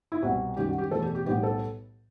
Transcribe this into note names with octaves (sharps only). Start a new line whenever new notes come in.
E4
C2 B2 G3 F#4
F#2 D#3 G3 G4
F#4
G4
E2 B2 A3 A4
G4
G4
B1 A2 G3 B3 G4
A4